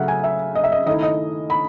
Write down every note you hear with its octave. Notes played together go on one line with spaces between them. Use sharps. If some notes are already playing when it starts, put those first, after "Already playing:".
Already playing: C#3 F#3 A3 E5 F#5
G#5
E5
D#5
E5
D#5
D#3 A3 E4 D#5
D#5
B5